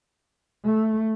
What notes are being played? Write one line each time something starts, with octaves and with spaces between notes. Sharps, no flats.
A3